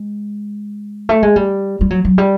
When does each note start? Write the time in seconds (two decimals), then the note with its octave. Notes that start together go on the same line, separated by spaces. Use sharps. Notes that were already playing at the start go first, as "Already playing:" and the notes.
Already playing: G#3
1.09 A3
1.23 G#3
1.36 G3
1.81 G3
1.90 F#3
2.05 F#3
2.18 G3